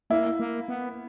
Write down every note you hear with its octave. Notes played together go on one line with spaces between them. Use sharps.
A#3 E4
A#3
B3